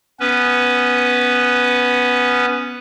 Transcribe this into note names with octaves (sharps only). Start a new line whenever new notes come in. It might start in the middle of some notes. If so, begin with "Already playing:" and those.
B3 C#4 B4